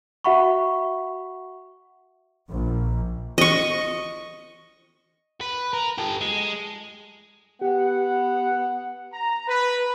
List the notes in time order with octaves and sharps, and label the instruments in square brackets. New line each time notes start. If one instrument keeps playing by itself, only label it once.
[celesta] F#4 E5 F#5 B5 C#6
[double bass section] A#1
[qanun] D#5 C#6
[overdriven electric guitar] B4
A#4
G4 A4
G#3
[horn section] B3 F#5 [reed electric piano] G4
[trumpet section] A#5
B4